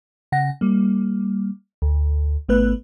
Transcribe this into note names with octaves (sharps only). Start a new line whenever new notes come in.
C#3 F#5 A#6
G3 A#3
D2
G#1 A3 B3 B4 F#6